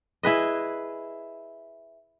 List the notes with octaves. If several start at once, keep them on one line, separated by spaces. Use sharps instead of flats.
E4 G#4 B4 D#5